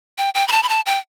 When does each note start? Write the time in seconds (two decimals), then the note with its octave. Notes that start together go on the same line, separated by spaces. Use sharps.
0.18 G5
0.35 G5
0.48 B5
0.52 A5
0.63 B5
0.69 A5
0.86 G5